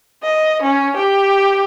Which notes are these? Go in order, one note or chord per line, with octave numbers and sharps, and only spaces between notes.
D#5
C#4
G4